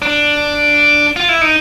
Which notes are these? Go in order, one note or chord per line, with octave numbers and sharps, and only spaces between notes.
D4
F4
E4
D#4